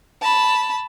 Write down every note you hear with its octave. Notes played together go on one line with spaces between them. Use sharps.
A5 B5